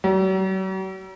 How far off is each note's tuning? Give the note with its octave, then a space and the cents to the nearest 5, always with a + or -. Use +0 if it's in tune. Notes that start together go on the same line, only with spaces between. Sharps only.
F#3 +45